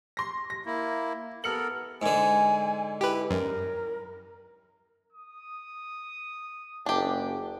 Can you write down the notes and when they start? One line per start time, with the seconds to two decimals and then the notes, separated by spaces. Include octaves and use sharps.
0.17 C6 A#6
0.50 A#6
0.66 A#3 E4
1.44 B3 A4 A#4 F6 C#7 F#7
2.02 G#2 D3 G#5
3.01 E4 G4 B4
3.30 F#2 A#4
5.13 D#6
6.86 F#1 D4 G4